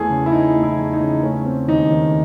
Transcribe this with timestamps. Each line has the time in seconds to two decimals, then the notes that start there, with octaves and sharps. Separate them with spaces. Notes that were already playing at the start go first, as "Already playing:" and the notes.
Already playing: E2 E3 A3 G#4 A4
0.10 C#3
0.26 E4
0.32 E3 D#4
0.55 A3
0.63 E4
0.77 E2
0.93 D#4
1.00 C#3
1.23 A3 C#4
1.45 C4
1.68 D#2 D#4
1.91 D#3